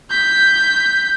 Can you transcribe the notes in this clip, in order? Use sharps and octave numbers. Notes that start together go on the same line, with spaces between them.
G6 B6